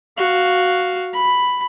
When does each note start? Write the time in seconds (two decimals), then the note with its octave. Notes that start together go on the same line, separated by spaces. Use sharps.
0.17 F#4 F5
1.13 B5